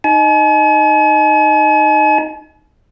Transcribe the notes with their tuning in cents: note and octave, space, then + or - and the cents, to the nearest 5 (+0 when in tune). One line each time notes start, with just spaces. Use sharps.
D#4 +0 G#5 +45